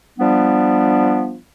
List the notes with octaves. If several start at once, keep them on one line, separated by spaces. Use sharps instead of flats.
F3 G3 B3 D4